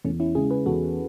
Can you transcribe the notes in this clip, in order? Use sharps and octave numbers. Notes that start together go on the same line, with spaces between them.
E2 A3 C#4
C#4 E4
C#3 G#3 E4 G#4
G#4 B4
E2 F#4 A4